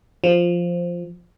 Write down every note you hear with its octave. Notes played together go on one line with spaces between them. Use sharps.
F3